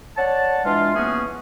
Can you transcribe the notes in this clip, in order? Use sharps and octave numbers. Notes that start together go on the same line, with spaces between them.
C#5 D5 F#5 A5
E3 G#3 D4 F4
E3 A#3 B3 C#4 F#4 G#4